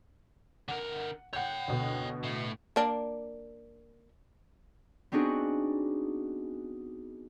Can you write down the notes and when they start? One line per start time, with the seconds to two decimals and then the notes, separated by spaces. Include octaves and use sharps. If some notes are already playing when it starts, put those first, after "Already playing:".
0.68 D3 A#4 F#5
1.33 C#5 F#5 G5 G6
1.68 D2 B2
2.23 A2
2.76 A#3 D4
5.12 B3 C4 D4 D#4 F#4 G#4